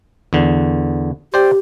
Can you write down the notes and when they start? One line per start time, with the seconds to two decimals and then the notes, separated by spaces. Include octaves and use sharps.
0.33 E2 D3
1.34 G4 C5 D5 G5